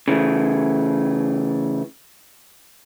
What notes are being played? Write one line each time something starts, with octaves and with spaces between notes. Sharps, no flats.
C#3 E3 A3